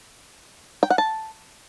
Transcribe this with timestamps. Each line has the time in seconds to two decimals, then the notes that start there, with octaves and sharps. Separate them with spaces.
0.83 G5
0.90 F#5
0.98 A5